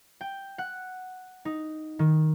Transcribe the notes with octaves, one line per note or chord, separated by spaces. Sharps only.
G5
F#5
D#4
D#3